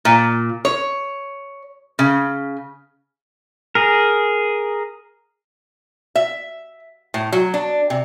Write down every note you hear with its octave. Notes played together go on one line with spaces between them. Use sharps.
A#2
C#5
C#3
G#4 A#4
E5
A2
F#3
D4
C3